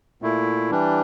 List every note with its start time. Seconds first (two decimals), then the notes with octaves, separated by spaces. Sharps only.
0.22 A#2 A3 E4
0.71 E3 G3 D4